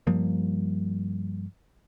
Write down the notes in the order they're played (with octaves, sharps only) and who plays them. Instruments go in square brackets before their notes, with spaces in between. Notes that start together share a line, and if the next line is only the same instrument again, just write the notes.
[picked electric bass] G2 F3 G3 A#3